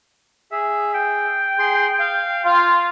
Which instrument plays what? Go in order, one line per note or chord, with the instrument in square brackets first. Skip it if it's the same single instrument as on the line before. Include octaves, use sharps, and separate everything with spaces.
[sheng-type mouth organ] G#4 [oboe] E5
[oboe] G5
[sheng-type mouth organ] G#4 C6
F5
[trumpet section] F4 [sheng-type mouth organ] F5